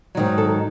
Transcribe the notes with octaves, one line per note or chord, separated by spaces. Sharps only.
G#2 D#3 F#3
A4